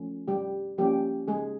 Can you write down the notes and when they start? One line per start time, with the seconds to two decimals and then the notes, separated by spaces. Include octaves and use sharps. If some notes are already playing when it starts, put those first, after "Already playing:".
Already playing: F3 A3 C#4
0.28 G3 G4
0.78 F3 G3 A#3 C#4 G4
1.28 G#3 G#4